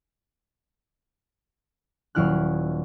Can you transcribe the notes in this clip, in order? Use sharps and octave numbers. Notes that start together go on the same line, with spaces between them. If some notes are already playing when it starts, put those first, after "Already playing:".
D#1 F#3 E4 F6 F#6